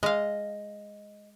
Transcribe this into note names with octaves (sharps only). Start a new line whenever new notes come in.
G#3 D#5 F5